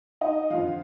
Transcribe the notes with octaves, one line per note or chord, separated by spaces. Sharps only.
D#4 D#5
F2 D3 F3 F4 F5